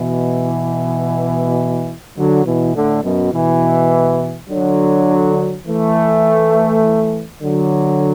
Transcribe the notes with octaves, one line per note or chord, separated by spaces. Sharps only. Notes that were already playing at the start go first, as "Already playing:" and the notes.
Already playing: B2 E3
D3 F#3
B2 E3
A2 D3
F#2 B2
B2 E3
D3 F#3
E3 A3
D3 F#3